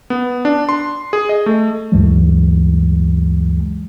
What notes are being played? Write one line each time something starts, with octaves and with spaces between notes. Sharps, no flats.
B3
D4
C6
G#4
D#5
A3
D2 G2 E3 F#3 G#3